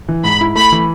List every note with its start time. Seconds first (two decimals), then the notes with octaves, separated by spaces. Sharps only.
0.08 E3
0.24 G#2 B5
0.41 E4
0.55 A3 B5
0.72 E3